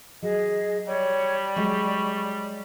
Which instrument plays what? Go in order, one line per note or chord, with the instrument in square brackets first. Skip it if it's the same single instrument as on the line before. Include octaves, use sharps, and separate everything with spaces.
[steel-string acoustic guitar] F#3 [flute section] G#4 D#5
[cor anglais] G3 [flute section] C#5
[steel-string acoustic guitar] F#3 G#3 D#5 [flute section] C#6